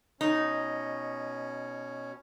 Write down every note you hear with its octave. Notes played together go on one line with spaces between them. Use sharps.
B2 C#4 D#4